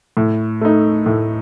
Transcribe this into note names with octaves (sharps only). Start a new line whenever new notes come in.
A2
A3 D#4
A2